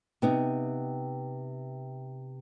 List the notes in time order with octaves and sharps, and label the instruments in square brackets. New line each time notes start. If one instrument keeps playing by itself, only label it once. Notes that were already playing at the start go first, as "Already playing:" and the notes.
[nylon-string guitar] C3 B3 D#4